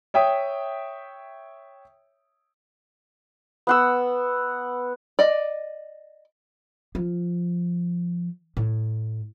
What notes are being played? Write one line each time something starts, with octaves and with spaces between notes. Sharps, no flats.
C#5 E5 G5 D#6
B3 F#5 E6
D5 D#5
F3
A2